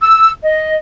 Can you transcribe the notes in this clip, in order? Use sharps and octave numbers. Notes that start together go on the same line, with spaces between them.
E6
D#5